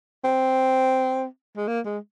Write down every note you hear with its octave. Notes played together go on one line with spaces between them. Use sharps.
C4
G#3
A#3
G#3